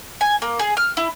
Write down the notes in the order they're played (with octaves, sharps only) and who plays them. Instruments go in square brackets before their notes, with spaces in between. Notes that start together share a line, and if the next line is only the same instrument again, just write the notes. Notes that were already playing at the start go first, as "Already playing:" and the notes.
[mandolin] G#5
A#3
G#4
F6
E4